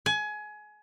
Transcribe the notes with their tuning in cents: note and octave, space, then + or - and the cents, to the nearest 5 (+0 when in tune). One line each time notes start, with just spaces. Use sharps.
G#5 +25